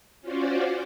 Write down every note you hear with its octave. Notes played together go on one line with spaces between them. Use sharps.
C#4 F4 F#4 C5 D5